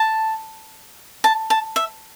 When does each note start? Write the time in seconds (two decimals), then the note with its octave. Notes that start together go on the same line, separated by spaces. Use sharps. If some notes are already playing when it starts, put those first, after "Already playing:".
Already playing: A5
1.24 A5
1.50 A5
1.76 E5